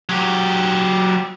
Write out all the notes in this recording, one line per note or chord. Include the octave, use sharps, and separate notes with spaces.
F#3 G4